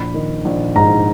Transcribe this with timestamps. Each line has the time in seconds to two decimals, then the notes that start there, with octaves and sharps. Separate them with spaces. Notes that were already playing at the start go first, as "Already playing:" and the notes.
Already playing: A#1 B5
0.14 D#3
0.45 A#1
0.76 G#2 A#5